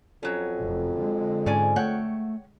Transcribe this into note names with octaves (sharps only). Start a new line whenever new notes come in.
F2 F#3 C#4
F1
D3 G#3
G#2 C#4 D5 G#5
A3 C#5 F#5 G5